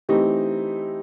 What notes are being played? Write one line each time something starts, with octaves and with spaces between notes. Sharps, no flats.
E3 A3 C4 D#4 G4